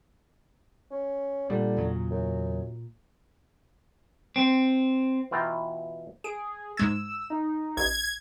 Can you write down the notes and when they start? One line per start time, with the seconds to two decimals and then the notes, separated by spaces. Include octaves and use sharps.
0.91 C#4
1.50 A#2 D3 G3
1.77 E2 C#3 F#3
2.11 F#2
4.36 C4
5.31 B2 E3 F4 G5 A#5
6.24 G#4 D7
6.77 G#2 G#3 E6 G#6
7.30 D#4
7.77 A1 G#6